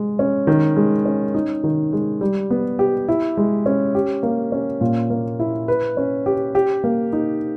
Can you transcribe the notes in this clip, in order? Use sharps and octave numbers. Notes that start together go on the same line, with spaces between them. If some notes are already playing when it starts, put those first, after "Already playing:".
Already playing: G#3
C#4
D#3
G#3
C#4
D#4
D#3
G#3
G3
B3
G4
E4
G#3
C#4
G4
A#3
C#4
A#2
A#3
E4
B4
C#4
G4
G4
A#3
D#4